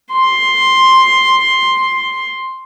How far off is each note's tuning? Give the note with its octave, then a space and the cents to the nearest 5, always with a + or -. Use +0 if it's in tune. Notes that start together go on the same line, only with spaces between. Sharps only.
C6 +5